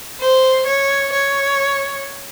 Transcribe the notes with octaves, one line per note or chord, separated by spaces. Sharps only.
C5
C#5
C#5